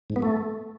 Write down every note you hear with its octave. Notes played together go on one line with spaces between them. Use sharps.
G#2
B3
A3